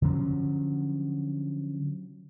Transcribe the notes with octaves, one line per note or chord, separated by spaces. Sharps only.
D3 F3 F#3 C#4